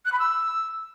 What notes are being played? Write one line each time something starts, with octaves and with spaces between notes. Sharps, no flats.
F#6
B5
E6